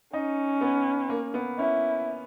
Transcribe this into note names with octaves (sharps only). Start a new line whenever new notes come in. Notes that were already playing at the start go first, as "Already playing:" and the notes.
C#4 D#4
B3
A#3
B3
C#4 E4